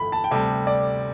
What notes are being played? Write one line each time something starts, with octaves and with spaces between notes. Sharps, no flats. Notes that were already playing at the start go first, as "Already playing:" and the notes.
Already playing: G1 F2 E3 B5
A5
G5
D2 C3 G3 A5
D5